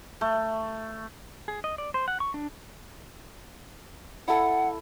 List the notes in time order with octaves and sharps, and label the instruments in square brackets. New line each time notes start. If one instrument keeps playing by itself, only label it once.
[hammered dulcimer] A3
[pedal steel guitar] G#4
D#5
D5
C5
F#5
C#6
D4
[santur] E4 A4 [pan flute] F#5